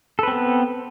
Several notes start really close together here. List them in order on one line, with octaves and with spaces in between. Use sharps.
A4 B4 C4 B3